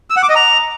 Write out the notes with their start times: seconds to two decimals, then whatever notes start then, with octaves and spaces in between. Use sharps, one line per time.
0.10 E6
0.16 F#5
0.23 D6
0.29 D#5
0.36 A#5